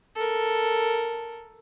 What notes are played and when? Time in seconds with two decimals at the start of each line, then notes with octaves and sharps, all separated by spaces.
0.15 A4 A#4